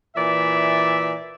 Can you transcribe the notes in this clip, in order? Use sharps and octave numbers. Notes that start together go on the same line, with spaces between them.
A#2 E3 D5 E5